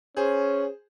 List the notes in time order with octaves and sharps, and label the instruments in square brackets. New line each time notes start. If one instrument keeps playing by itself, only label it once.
[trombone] C#4 [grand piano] G#4 C5